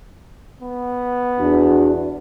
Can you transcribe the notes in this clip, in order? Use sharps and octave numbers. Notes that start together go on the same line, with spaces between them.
B3
E2 D4 F#4